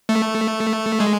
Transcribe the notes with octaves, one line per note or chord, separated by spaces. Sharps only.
A3
G#3